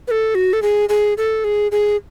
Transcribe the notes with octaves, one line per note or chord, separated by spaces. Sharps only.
B4
A4
F#4
A4
G#4
G#4
A4
G#4
G#4